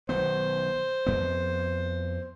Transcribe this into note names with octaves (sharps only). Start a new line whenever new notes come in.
B1 D#3 B3 C5
F2 B3